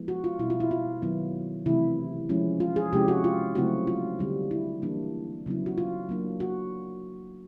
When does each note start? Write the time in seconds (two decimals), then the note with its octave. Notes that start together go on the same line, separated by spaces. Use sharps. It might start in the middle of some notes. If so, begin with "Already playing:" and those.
Already playing: F3 G#3 B3 E4
0.08 F#4
0.24 F4
0.39 B2 G3 C4 E4
0.50 F4
0.60 E4
0.71 F4
1.02 D#3 F#3 B3 E4
1.66 C3 E3 A3 E4
2.29 F3 G#3 C#4 E4
2.60 F4
2.76 G#4
2.93 C3 F3 G#3 C#4 E4 G4
3.08 F#4
3.24 F4
3.55 C#3 F#3 A3 C4 E4 F#4
3.87 F4
4.19 D3 G3 C4 D#4
4.51 E4
4.82 E3 G3 A#3 D4
5.46 C#3 F#3 B3 E4
5.66 F#4
5.78 F4
6.09 F#3 A#3 D4
6.40 F#4